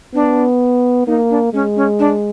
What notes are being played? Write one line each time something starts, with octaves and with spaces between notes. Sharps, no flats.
B3 D4
A#3 D#4
D4
G#3 C#4
C#4
D4